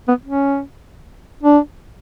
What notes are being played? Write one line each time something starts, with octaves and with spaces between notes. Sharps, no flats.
B3
C#4
D4